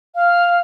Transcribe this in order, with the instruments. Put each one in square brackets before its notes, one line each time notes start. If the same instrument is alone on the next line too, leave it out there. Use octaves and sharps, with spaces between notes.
[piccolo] F5